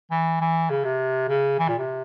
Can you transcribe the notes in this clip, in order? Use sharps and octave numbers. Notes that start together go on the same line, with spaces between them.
E3
E3
C#3
C3
C#3
E3
A#2
C3